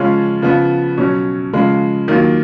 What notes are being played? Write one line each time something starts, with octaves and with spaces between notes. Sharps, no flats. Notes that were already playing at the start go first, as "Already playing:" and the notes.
Already playing: C#3 F3 G#3 C#4 F4
C#3 F3 B3
B2 F#3 C#4
C#3 F3 G#3
D#3 F#3 A#3 F4